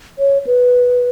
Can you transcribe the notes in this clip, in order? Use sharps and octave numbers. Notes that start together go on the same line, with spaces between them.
C#5
B4